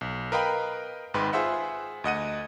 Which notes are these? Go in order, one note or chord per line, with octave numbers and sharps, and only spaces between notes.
B1
A#4 B4 D#5 F5 G5 B5
G#1 G#2 B4 G5 C6
F4 G#4 C5 E5 F#5
D2 D#5 F#5 D#7